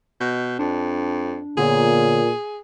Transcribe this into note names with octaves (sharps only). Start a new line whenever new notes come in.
B2 D#5 G6
F2 D4
A#2 D3 B3 G#4 C#5